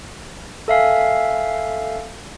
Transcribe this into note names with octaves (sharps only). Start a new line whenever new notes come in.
A4 E5 F5 G#5